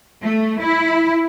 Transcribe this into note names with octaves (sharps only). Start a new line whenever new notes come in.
A3
E4